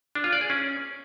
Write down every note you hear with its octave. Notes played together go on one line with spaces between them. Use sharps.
D4
F4
D5
G#4
C#4